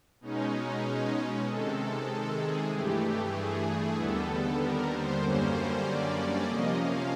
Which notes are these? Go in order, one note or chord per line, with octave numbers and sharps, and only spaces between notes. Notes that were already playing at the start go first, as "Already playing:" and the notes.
B2 G#3 C#4 D#4
C3 D#3 G#3 A4
G#4
G2 E3 A3 G4
G#4
D#2 D3 G3 B3 A4
A#4
C5
F#2 D3 G3 A#3 C#4
D5
C3 F3 A#3 C#4 D#5
F5